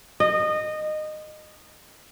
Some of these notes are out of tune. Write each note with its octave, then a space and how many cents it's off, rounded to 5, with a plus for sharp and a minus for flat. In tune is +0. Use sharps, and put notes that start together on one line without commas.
D#5 -20